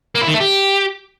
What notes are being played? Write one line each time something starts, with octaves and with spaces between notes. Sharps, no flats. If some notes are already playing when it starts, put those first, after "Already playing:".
A#3
E4
D#3
A3
G4